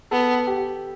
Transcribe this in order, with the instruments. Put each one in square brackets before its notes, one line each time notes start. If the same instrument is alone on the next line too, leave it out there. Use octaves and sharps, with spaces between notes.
[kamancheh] B3 [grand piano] A4
[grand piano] G4